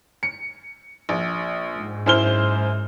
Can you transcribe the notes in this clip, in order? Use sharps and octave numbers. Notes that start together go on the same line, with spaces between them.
C#7
A#1
G#2
F#2 E4 C5 F6 G7